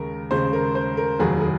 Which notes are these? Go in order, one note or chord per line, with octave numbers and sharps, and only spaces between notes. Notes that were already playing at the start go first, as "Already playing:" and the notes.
Already playing: D#2 C#3 G#3 A#4
D#2 C#3 G#3 C5
A#4
C5
A#4
F1 D#2 D#3 F#3 G#4
G#4